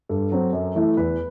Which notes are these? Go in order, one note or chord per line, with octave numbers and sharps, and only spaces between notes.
G2 A4
F#3 C4
F#2
E3 A3 E4
E2 B4